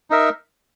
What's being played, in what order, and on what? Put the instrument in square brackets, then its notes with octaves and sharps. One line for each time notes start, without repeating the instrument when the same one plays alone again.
[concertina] D#4 A#4 E5